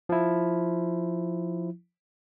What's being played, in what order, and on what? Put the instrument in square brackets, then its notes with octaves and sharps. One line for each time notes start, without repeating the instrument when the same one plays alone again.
[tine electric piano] F3 E4